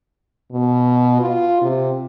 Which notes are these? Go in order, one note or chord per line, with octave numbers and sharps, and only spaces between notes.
B2
F4
C3